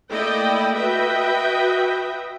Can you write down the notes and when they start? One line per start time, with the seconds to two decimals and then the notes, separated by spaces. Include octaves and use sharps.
0.12 A3 A#3 E4 D5 D#5 G5
0.76 F#4 B4 D#5 E5 G5